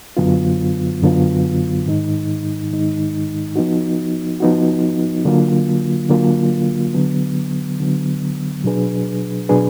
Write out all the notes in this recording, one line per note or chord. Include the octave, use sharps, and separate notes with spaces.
F#2 D3 F#3 B3 F4
F#2 D3 F#3 B3 F4
G#2 D#3 G#3 D#4
G#2 D#3 G#3 D#4
F3 B3 D#4 F#4
F3 B3 D#4 F#4
D3 F#3 A#3 F4
D3 F#3 A#3 F4
D3 F#3 B3
D3 F#3 B3
B2 F#3 D4 G#4 B4
B2 F#3 D4 G#4 B4